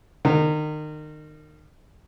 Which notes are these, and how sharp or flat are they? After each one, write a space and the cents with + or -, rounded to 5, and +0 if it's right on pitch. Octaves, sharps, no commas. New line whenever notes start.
D#3 -30